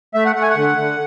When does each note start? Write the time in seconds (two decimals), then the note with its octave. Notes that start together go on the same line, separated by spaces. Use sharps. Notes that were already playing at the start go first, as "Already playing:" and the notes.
0.14 A3 E5
0.26 F#5
0.36 A3 F#5
0.42 G#5
0.50 F#5
0.56 D3
0.77 D3